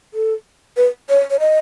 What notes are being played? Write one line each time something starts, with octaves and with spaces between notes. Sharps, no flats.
A4
B4
C#5
C#5
D#5